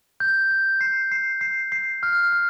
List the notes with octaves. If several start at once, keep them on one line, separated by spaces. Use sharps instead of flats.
G6
G6
C7
C7
C7
C7
F6
F6